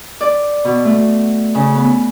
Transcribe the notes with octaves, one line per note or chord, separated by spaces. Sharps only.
D5
B2
A3
C#3
B3